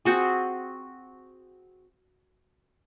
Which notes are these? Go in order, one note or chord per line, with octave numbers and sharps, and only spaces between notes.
C4 F#4 G#4